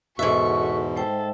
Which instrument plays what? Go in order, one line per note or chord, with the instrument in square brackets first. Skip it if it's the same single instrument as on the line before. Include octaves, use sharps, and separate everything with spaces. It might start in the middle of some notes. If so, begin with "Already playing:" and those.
[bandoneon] E2 B2 [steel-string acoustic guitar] G#2 E5 [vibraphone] F#4 A4 [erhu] C#6
[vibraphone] G#3 C5 G5 [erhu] A4